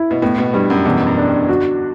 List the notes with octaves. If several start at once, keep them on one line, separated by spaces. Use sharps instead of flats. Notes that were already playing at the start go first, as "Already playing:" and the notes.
Already playing: E4
B2
A2 B3
B2
G2 G3
F#2
E2 B2
F#2
D4
G2
D3 F#4